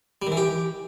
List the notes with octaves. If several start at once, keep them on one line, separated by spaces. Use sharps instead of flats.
G3
D#3
E3
G4